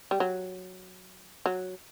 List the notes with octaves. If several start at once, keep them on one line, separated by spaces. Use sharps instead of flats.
G3
F#3
F#3